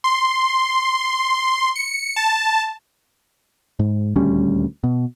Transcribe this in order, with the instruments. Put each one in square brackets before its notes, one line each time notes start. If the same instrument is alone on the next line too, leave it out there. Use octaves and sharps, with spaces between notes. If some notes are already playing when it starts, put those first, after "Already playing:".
[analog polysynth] C6
C#7
A5
[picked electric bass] G#2
D#1 D2 G3 C#4
B2